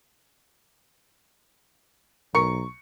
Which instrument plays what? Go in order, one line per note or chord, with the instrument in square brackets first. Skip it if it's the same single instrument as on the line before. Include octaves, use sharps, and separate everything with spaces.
[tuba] B1 [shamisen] A#4 [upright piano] C#6 C#7